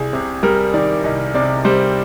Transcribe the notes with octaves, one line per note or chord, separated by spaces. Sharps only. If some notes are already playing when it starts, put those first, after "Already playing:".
Already playing: C2 G#4
C3
G3 A#4
D#3 D5
C2 D#5
C3 D5
G3 C5